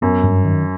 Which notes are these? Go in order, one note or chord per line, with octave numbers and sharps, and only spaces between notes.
F#2 B3
G2
D#3